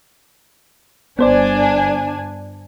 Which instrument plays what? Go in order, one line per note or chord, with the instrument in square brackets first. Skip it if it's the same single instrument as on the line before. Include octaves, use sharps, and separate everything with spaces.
[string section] G1 D4 G#5 [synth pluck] B3 C5 D5